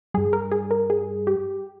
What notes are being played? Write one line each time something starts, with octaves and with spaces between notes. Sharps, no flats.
G2 G3 G#4
A#4
G#4
A#4
G#4
G4